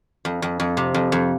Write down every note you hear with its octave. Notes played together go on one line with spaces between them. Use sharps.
F2
F2
F2
C3
F2
F2